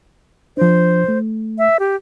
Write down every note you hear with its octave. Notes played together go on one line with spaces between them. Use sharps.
F3 D4 C5
A3
E5
G4